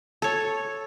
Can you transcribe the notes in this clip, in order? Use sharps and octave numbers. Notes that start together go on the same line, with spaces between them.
A4 C#5